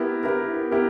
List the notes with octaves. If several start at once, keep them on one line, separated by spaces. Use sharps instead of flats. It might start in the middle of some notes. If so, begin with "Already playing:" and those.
Already playing: B3 E4 G4 A#4
B3 E4 G4 A#4
B3 E4 G4 A#4